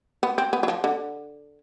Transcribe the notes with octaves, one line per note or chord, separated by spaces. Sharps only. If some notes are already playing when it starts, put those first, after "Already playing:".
B3
C4
B3
F#3
F3
D3